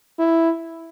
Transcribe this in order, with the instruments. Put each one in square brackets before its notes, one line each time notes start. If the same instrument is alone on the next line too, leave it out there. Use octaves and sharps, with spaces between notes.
[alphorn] E4